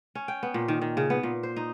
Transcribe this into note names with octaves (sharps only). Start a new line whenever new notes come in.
C#4
G5
B3
A#2
D#3
D#3
C#3
B3
A#2
C5
D#4